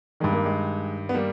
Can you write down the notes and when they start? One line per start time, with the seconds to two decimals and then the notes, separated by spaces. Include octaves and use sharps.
0.20 G2 D#3 G#3
0.33 A#3
0.46 G#3
1.09 B3
1.14 G3 A#3